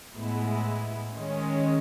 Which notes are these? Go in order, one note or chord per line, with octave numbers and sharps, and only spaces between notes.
A2 G#3 B3 E4
D#3 G#3 C#4